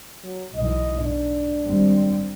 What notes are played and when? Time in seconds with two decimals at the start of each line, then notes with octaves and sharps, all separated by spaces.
0.23 F#3
0.56 B1 G#2 E3 D#5
1.01 G#2 D4
1.63 G#1 G3 C4